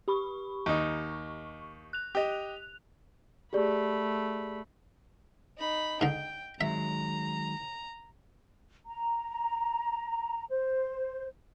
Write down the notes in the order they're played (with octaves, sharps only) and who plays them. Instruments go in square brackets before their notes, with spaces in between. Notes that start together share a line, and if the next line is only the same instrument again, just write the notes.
[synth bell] G4 B5 C#6
[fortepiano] D#2 D#4 [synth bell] C#6
[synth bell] F#6 F7
[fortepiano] G4 D#5
[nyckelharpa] A3 B5 [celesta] G4 G#4 D5
[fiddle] D#4 B5
[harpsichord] G#2 D3 [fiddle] G5
[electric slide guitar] D#3 F#3 G#3 [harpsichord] E5 [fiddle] A#5
[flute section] A#5
C5